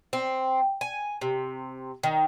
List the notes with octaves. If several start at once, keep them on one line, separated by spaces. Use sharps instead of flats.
C4
G#5
C3
D#3